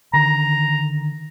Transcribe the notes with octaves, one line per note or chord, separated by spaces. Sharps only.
D3 D#3 A#5